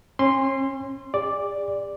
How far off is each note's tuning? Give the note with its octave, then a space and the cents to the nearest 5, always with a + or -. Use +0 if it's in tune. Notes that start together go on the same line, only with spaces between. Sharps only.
C#4 -40 C6 +0
G#4 -45 D5 +0